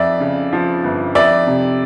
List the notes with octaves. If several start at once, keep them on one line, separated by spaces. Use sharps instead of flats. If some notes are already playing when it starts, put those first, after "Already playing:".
Already playing: F2 D5 E5
C#3
F3
G1
F2 D5 E5
C3